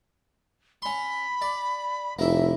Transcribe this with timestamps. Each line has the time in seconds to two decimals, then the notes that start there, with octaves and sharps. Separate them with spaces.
0.82 C#4 B5 C6
1.42 D5
2.19 F1 A#3 E4 E5